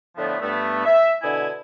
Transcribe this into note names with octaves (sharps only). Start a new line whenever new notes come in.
A2 D3 F3 A3 B3
G2 A3 B3
E5
B2 D3 E4 G#5